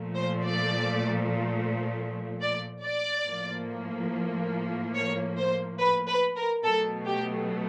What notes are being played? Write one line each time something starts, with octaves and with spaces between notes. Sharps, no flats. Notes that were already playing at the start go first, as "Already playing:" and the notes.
Already playing: A#2 F3 A3
C5
D5
D5
D5
A2 F3 A#3
C#5
C5
B4
B4
A#4
B2 F#3 A3 A4
G4